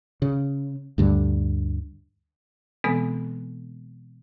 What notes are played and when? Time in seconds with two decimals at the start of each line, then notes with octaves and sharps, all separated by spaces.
0.22 C#3
0.98 D2 G2 D3
2.84 B2 E3 G#3 B3 C4 A4